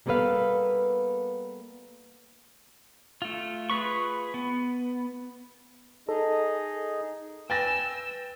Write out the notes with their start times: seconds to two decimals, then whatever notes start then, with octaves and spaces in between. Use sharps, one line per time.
0.06 G3 A#3 B3 A4 B4 F5
3.22 A3 F4
3.70 F4 G#4 B4 C#6
4.34 B3
6.09 D#4 G#4 A4 D#5
7.50 B4 G5 G#5 E6 A6 A#6